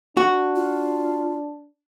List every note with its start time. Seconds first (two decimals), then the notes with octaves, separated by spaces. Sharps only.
0.17 D4 F#4
0.56 F4